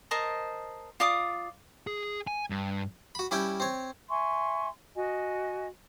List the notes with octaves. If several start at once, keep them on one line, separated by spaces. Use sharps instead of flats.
A#4 C5 D#5 A5
F4 D5 D6 D#6
G#4
G#5
G2
F#4 B5
G3 C#4 E4 E5 G5
C4 C#5
E5 G#5 C6 C#6
F#4 D#5 G#5